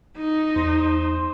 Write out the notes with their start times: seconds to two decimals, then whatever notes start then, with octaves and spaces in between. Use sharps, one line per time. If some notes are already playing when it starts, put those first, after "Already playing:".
0.17 D#4
0.56 E2 C5